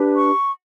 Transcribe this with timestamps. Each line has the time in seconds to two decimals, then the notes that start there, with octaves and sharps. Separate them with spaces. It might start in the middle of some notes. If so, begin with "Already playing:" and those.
Already playing: D4 G4 B4
0.16 C#6